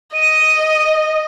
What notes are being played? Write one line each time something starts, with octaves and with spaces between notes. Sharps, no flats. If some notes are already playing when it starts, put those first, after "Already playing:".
D#5 D#7